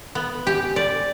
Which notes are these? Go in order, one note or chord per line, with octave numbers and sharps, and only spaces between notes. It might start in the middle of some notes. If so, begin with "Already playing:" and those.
B3
G4
D5